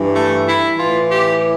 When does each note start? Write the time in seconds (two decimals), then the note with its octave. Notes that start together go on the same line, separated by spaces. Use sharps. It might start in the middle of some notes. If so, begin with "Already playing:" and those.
Already playing: G2 E3
0.14 A3
0.46 E4
0.77 E3 F4
0.83 A2
1.09 G4